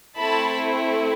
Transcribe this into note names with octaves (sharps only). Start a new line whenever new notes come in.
A3 C4 E4 A5 B5